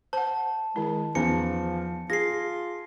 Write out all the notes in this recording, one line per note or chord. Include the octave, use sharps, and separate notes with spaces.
C5 F#5 A5
D#3 G#3 E4
E2 F3 C#4 D#4 A#5 C#7
F4 G#4 A#6 C7